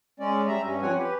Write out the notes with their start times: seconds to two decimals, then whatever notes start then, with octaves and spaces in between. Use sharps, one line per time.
0.20 G#3 C#4 D5
0.47 G3 E5 A#5
0.63 G2 C#4
0.82 F3 C4 C#5 F#5 G#5
0.98 G4 B4